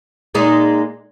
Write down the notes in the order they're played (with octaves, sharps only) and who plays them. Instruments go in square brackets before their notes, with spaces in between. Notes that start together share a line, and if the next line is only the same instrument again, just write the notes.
[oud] A#2 G#3 D#4